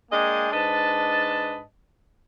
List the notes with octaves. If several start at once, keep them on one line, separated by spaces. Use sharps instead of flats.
G#3 A#3 D4 D#5 G5 G#5
G#2 D4 B4 D#5 A5